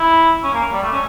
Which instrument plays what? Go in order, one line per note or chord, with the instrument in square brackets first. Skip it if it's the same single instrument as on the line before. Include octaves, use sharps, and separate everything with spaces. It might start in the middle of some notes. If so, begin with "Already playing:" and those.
Already playing: [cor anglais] E4
C#4
A#3
G3
A3
C#4